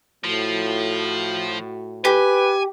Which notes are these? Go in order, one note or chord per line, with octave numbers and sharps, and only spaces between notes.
A2 F3 F#4
G4 B4 G#5